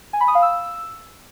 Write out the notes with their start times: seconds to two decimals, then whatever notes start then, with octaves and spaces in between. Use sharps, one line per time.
0.13 G#5
0.21 B5
0.28 D#6
0.35 F5
0.42 E6